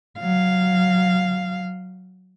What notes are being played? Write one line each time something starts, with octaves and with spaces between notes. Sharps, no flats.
F#3 F5